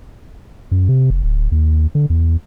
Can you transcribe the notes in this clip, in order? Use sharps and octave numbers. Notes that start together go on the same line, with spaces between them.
F#2
C3
F1
D1
D#2
D3
E2